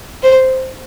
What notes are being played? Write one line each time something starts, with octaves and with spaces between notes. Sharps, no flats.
C5